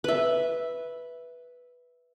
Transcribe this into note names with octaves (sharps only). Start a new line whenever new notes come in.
B4 E5